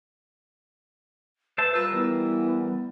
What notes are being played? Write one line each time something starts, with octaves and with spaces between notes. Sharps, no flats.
B4 C5 E5 A5
G3 F4 A#4 B4 E6
E3 B3